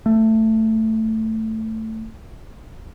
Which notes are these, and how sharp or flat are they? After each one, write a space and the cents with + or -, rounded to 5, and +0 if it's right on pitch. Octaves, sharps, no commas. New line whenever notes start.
A3 +10